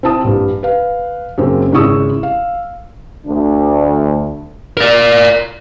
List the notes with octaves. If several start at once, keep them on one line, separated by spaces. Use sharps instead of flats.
C4 E4 A5 D#6
A#1 G2
B4 F5
F#2 C#3 A#3 C4
G#1 C#3 E4 C#6 D#6 E6
F5
D2 D4
A#4 D5